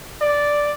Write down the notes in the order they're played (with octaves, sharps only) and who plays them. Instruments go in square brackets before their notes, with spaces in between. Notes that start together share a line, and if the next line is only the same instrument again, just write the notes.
[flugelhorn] D5